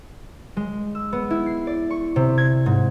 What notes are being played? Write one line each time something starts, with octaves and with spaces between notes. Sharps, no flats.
G#3
E6
B3
E4
C7
D5
C#6
C3
G#6
G#2